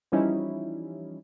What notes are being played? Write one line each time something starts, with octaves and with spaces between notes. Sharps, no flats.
E3 F3 G3 C#4 D#4 E4